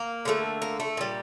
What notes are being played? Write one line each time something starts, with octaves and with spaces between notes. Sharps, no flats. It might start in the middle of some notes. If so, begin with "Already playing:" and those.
Already playing: A#3
D3 F#3 A3
A#3
A3
A#2 G3